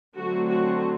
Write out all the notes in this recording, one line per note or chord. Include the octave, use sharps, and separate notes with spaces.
D3 F#3 A3 C4 F#4
F#4